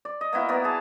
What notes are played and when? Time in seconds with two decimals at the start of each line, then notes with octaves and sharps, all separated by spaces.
0.05 D5
0.21 D#5
0.33 A#3 B3 E4 F#4
0.49 B3 A#4 D5
0.64 G#4 A5